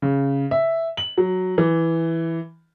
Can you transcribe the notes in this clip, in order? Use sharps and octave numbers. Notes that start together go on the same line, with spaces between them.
C#3
E5
F#7
F#3
E3